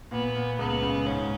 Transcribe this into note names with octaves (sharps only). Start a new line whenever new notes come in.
A#2 B3
A#2
C#2 B3
C#3
G#2 C#4